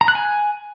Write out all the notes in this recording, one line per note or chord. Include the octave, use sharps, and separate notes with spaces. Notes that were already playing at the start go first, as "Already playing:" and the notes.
A#5
F#6
G#5